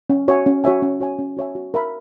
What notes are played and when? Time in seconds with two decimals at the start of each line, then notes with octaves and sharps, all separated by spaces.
0.10 C#4
0.28 F#4 C#5 E5 G#5
0.46 C#4
0.64 F#4 C#5 E5 G#5
0.82 C#4
1.00 F#4 C#5 E5 G#5
1.19 C#4
1.37 F#4 C#5 E5 G#5
1.55 F#4
1.74 A#4 E5 B5